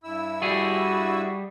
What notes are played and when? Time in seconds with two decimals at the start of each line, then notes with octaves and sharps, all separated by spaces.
0.04 G2 E4 E6
0.42 G3 F#4 G#4